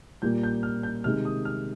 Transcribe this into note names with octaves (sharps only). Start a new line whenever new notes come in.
A#2 G3 A#3 G6
G6
F6
G6
C3 D#3 G#3 F6
D#6
F6